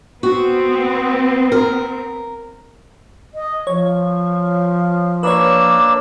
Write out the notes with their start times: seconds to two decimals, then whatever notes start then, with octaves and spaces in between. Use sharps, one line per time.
0.23 B3 C4 F#4
1.52 A#4
3.34 D#5
3.67 F3 C#5
5.23 A#3 D4 B4 C#5 E6